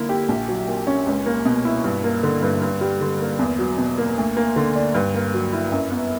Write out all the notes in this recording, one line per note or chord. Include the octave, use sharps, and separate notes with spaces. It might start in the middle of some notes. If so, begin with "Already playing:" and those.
Already playing: D3 A#3 E4
G4
A#1
F#3
A#2
C#4
C#2
A#3
B2
E4
G2
A#3
D3
G2
G2
G3
D3
A#3
E2
F#3
B2
A#3
D2
A#3
D3
D4
G2
A#3
F#3
E4
F#2
B3